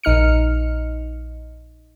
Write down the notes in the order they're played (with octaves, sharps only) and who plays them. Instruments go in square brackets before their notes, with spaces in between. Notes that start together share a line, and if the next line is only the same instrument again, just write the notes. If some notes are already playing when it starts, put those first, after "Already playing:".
[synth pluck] A#1 D#4 F6 C#7